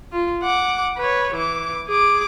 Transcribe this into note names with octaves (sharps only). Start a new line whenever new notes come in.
F4
F#5 D6
B4 C#5
E3 D6
G#4 D6